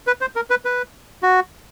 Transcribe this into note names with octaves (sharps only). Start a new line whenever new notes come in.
B4
C5
A#4
B4
B4
F#4